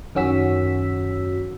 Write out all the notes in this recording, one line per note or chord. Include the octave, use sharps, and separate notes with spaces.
F#2 D#3 C#4 F#4 E6 B6